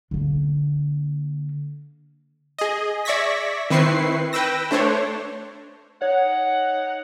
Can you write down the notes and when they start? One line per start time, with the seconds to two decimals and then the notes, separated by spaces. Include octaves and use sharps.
0.11 D3 A#3
2.59 G#4 D#5
3.05 D5 E5 C#6 G#6 A#6 B6
3.70 D#3 C4 E4 B4 C#6 C7
4.33 B4 G5 E6 A#6
4.71 A3 D4 C5 C#5
6.02 D#4 C#5 F#5